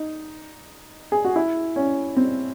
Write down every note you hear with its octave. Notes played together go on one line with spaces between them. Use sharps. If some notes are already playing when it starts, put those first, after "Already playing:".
Already playing: D#4
G#4
F#4
E4
C#4
C4